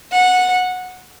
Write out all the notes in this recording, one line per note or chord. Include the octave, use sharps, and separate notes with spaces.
F#5